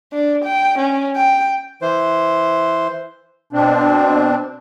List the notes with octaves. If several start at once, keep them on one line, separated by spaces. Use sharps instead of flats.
D4
G5
C#4
G5
E3 C5
B2 C4 D4